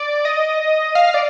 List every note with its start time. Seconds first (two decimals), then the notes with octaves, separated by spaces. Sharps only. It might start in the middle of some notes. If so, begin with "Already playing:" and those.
Already playing: D5
0.25 D#5
0.95 F5
1.14 D5